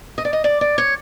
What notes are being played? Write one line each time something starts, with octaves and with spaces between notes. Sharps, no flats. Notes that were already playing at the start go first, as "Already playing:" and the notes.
D#5
D5
D#5
D5
D5
C#5